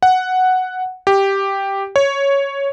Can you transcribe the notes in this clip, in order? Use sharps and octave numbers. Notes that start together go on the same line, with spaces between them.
F#5
G4
C#5